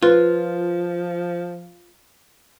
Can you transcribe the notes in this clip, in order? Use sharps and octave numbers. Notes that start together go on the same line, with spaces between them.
F3 F4 B4